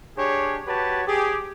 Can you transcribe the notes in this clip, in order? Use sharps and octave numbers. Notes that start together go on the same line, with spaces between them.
D4 G4 G#4 C#5
F#4 G4 B4 C#5 A5
G4 G#4